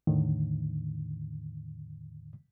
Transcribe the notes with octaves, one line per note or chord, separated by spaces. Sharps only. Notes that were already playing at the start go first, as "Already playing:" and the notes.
E2 A2 D3 D#3